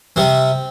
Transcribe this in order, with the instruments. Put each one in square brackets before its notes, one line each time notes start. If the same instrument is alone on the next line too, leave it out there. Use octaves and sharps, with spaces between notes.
[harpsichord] C3 G3 C4